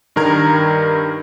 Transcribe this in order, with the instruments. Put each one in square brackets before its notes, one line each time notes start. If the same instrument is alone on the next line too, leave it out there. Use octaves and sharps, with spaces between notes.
[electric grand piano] G2 D#3 A#4 A#5 G#6